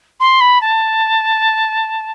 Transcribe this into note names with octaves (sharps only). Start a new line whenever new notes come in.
C6
B5
A5